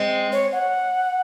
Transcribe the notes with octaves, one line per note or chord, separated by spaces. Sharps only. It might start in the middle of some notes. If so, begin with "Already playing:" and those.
Already playing: G#3 C4
C#5
F#5